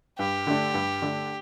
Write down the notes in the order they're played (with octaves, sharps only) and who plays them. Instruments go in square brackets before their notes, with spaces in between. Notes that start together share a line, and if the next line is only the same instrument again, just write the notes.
[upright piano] G2 [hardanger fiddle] G4
[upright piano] D3 A3 D4
G2
D3 A3 D4